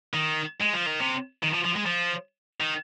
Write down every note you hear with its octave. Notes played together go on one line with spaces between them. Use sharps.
D#3
G#3
F3
D#3
C3
D#3
F3
F3
G#3
F3
D#3